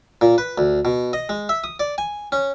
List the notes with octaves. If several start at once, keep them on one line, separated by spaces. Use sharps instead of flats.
A#2
B4
D2
B2
D#5
G#3
E5
D#6
D5
G#5
C#4